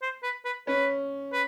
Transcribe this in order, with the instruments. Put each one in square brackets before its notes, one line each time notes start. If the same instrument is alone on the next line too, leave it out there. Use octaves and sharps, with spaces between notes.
[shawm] C5
B4
B4
[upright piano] C#4 [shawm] B4
[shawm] B4